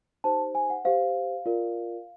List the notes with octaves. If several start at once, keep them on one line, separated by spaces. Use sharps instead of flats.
D#4 G4 C5 A5
G#5
F#5
G4 C5 F5
F4 A#4 D5